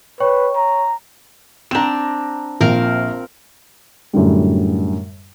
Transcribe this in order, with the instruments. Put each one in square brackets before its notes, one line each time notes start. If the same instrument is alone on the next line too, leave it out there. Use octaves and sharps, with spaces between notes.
[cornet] B4 [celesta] C#5 G5 C#6
[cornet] A#5
[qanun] C4 D4 [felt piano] A#5 E7
[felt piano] A#1 [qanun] C4 A#4 F5
[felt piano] F#2 A2 D3 G3